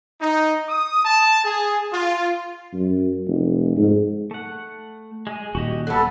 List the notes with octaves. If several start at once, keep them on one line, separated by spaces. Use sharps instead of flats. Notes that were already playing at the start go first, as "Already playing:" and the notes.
D#4
D#6
A5
G#4
F4
F#2
F1
G#2
A3 F#5
G#3 D#5 G#5
D#1 F#4 G4 D#5
F#3 B3 A4 F#6